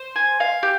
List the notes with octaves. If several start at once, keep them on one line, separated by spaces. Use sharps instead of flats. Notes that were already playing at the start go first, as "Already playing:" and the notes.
Already playing: C5
G#5
F5
G4